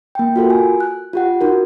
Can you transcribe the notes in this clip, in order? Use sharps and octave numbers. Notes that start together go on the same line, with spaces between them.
A#3 G5
F4 F#4 A4 A#4
G#5
F#6
F4 G4 F#5
D#4 F#4 A#4